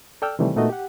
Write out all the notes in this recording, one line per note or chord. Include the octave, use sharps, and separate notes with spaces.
A4 D5 G5 E6 F6
C3 D#3 E3 G3 A3
A#2 A3 B3 D#4 F#4 D#5
G4 F#5